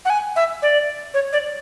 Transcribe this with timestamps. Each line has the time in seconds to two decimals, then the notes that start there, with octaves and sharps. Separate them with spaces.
0.05 F#5
0.10 G#5
0.36 E5
0.62 D5
1.14 C#5
1.33 D5